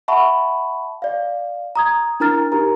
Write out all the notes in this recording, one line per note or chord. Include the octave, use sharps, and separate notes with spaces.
E5 F#5 A5 B5 C#6
D5 F5
A#5 D#6 G#6
D4 E4 A#4 A#5 F6 A6
D#4 G4 A#4 A#5